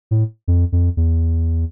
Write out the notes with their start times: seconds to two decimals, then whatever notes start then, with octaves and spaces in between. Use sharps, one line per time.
0.11 A2
0.48 F2
0.72 F2
0.97 E2